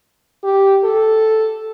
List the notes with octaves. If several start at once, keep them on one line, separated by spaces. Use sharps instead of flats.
G4
A4